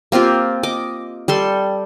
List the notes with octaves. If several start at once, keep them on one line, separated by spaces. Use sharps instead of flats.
A#3 C4 F4 G4
D#5 D6
G3 A4 C6